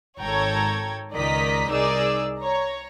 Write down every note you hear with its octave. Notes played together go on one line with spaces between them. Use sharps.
G#1 A4 C#5 G5 A#5 G#6
C#2 D#3 D5 D#5 A#5 B6
C2 D#4 G#4 A#4 D5 E6
C#5 A#5